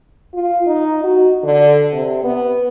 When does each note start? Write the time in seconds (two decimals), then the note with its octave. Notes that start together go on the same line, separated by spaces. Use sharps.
0.34 F4
0.67 D#4
1.03 F#4
1.43 D3
1.92 C3
2.24 B3